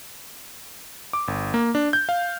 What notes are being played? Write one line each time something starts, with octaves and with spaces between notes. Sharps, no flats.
D6
G1
A#3
D4
G6
F5